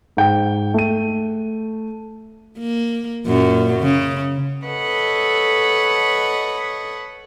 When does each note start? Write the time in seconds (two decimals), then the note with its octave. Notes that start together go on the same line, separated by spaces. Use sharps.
0.17 G#2 G5
0.74 A3 D#7
2.59 A#3
3.27 F#2 A#2 F#3
3.80 C#3
4.66 A4 B4 C#5 D#5 F#5